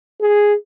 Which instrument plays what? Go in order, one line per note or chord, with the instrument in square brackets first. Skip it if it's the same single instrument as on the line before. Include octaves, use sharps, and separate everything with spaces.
[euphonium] G#4